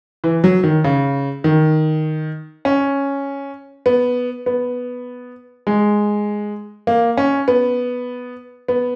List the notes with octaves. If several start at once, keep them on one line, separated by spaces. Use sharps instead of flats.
E3
F#3
D#3
C#3
D#3
C#4
B3
B3
G#3
A#3
C#4
B3
B3